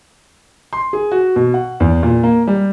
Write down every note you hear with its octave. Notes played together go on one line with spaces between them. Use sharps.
C6
G#4
F#4
B2
F#5
E2
A#2
A#3
G3